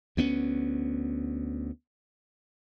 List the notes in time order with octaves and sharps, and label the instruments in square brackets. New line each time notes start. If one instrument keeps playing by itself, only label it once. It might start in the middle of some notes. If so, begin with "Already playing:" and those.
[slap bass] D2 B3 C#4